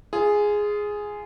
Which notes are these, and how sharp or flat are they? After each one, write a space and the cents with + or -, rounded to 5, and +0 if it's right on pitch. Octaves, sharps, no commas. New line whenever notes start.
F4 -20 G#4 +0